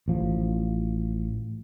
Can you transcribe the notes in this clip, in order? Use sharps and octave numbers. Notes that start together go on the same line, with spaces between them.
A1 F3